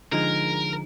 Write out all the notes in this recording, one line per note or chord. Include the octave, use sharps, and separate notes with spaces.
D3 F3 G#3 D#4 G#4 A#4